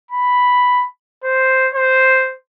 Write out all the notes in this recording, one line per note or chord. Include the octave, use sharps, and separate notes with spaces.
B5
C5
C5